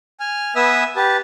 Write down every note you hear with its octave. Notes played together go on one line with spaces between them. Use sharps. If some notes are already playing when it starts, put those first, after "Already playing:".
G#5 F6
B3 B4 E5 G#5 D#6 E6
G4 B4 A5